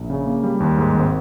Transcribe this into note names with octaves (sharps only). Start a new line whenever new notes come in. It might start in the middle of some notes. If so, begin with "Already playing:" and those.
Already playing: A#1
C#3
A#3
G3
D#2
G#2
G#1